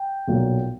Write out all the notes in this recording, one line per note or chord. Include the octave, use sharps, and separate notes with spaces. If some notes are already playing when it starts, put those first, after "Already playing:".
Already playing: G5
B1 A#2 F#3